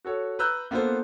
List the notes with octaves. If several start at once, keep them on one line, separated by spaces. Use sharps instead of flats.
F#4 A4 C#5
B4 A#5 E6 F#6 G6
A#3 B3 D4 F4 A4 C5